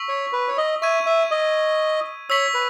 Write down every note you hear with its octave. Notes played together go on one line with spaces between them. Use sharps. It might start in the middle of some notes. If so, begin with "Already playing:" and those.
Already playing: C#6 E6 B6 F#7
C#5
B4
C#5
D#5
E5 C#6 G#6 D#7
E5
D#5
C#5 E6 B6 F#7
B4